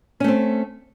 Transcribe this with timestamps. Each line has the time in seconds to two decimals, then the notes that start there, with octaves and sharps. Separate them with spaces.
0.20 C#4
0.24 A3
0.28 C4